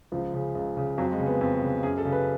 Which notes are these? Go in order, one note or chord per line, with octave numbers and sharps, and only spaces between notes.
C#2 F3
C#3
C#2
C#3
F2 F#3
G#3
C#3
B3
F2
C#3
F#2 G#4
A4
C#3
B4